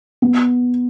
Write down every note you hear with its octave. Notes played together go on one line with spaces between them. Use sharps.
B3